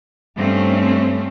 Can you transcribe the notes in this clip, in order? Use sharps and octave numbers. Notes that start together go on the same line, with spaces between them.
G2 A3 C4 C#4